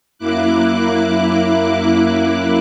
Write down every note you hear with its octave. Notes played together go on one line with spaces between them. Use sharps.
F#2 A#3 E4 D6 F#6